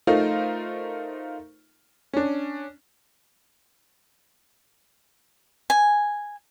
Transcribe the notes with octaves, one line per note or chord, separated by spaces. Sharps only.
A3 D#4 F4 A#4 C5
C#4 D4
G#5